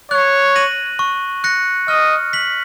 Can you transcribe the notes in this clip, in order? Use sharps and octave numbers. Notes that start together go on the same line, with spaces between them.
C#5 F#6
A#6 D#7 F#7
C#6
F#6 A#6 C#7
D#5 F6
B6 F#7